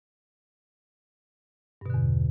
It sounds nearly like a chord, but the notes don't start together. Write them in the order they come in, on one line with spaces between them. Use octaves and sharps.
G2 B2 D3 E2